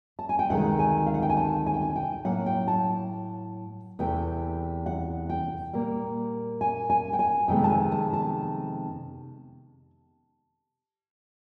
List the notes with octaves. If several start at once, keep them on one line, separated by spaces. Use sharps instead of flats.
A5
G#5
G5
D2 C3 D#3 G#3 F#5
G#5
F5
F#5
G5
G#5
A5
G#5
G5
G#5
G5
A2 F#3 A#3 F#5
G5
A5
E2 C3 E3 A3 G5
F#5
G5
A#2 G3 A#3
G#5
G#5
G5
G#5
F2 C3 D#3 G#3 B3 G5
A5
G#5
A5
A5